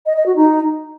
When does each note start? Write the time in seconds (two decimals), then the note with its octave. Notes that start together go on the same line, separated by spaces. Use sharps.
0.06 D#5
0.16 D#5
0.26 F#4
0.36 D#4